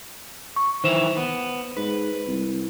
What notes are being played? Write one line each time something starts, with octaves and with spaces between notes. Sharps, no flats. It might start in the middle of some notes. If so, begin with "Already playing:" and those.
C#6
D#3 E3 C5 E5 E7 F7
B3
G#2 B4
C2